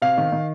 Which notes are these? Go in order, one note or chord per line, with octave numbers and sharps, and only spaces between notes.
C3 F5
D#3
D#3